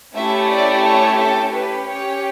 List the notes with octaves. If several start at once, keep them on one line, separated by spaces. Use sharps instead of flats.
A3 C#4 E4 G4 E5
D5
C#5
A4
C#4 G4 B4
C#5